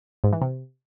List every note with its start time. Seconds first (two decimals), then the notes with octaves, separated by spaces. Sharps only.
0.24 G#2
0.33 E3
0.42 C3